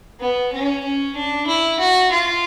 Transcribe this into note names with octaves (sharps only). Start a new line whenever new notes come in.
B3
C#4
C#4
D4
E4
F#4
F4